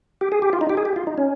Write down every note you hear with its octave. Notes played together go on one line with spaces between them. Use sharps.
G4
G#4
G4
F4
D#4
G4
G#4
G4
F4
D#4
C#4